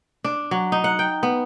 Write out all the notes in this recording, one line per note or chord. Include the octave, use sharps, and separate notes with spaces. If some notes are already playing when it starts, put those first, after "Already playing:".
D4
F#3
D#4
F#5
G5
B3